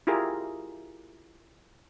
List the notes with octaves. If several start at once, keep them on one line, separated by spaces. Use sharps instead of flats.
E4 F4 G4 G#4 A#4